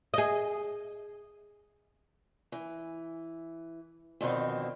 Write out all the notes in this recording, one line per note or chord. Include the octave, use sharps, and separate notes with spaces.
G#4 D#5
E3
F2 B2 D3 D#3 C4